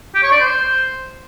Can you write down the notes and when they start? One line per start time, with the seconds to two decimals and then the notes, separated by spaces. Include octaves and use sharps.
0.15 G4
0.23 C#5
0.32 D5
0.40 C5